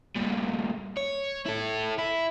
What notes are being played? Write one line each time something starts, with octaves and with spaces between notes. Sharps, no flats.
G2 A#2
C#5
E4 A4
E4